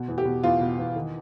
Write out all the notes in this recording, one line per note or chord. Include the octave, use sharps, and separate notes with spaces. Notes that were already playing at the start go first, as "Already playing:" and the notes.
Already playing: B2
E2
G4
B2
E2 F4
B2
E2
D#3